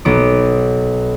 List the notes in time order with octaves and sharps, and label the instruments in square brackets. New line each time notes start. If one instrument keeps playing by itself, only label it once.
[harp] B1 B3 D6